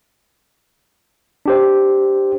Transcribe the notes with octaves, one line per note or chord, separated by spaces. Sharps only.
D4 G4 C5